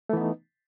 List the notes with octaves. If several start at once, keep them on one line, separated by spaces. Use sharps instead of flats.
E3 A3 B3 D#4